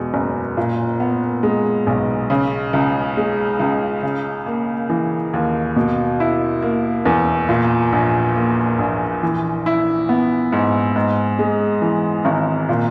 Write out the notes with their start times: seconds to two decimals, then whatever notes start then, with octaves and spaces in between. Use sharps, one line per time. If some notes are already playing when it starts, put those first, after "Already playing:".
Already playing: E2 B2 G#3
0.14 F#1
0.57 A#2
1.00 B3
1.43 G#3
1.87 B1
2.30 C#3
2.73 C#2
3.17 G#3
3.59 C#2
4.03 C#3
4.46 A#3
4.90 E3
5.34 D#2
5.76 B2
6.20 E4
6.62 A#3
7.05 E2
7.49 A#2
7.93 A#1
8.36 A#3
8.79 A#1
9.23 E3
9.66 E4
10.09 B3
10.52 G#2
10.96 G#2
11.39 G#3
11.82 E3
12.25 G#1
12.69 A#2